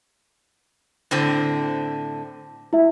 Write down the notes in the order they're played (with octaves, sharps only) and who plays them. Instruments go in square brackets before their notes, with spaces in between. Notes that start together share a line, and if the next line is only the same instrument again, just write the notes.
[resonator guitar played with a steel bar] A2 D3 C4
[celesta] E4 E5